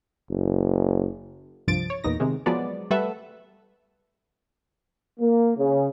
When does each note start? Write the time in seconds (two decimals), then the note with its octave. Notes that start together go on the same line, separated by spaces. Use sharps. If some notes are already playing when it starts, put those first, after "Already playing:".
0.30 F#1
1.67 C2 G2 F3 A6 D7
1.90 C#5
2.04 E2 A#2 D#4 A#6
2.20 C3 D#3 G#3
2.46 F3 F#3 G#3 B3 D5
2.90 G3 A3 A4 B4 E5 F#5
5.20 A#3
5.57 C#3